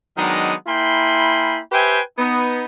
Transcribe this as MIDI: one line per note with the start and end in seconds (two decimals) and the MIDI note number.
0.17 0.53 51
0.17 0.53 54
0.17 0.53 56
0.17 0.53 59
0.17 0.53 62
0.17 0.53 63
0.67 1.59 58
0.67 1.59 64
0.67 1.59 79
0.67 1.59 80
0.67 1.59 83
0.67 1.59 84
1.71 2.00 67
1.71 2.00 71
1.71 2.00 72
1.71 2.00 76
1.71 2.00 79
1.71 2.00 80
2.18 2.65 59
2.18 2.65 63